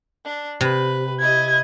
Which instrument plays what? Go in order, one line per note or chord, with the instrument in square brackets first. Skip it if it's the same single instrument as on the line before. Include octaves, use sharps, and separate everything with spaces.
[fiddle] D4
[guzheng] C3 [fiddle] B4
[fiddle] E4 D#5 [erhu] G#6